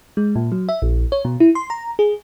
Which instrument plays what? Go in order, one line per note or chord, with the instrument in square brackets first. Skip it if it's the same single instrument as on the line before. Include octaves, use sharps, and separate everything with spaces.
[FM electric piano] G#3
A#2
F#3
E5
A#1
C#5
B2
E4
C6
A#5
G#4